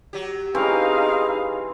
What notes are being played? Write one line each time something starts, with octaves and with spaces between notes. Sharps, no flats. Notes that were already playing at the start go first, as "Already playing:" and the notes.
F#3 G4
E3 C4 C#4 D#4 G#4 F5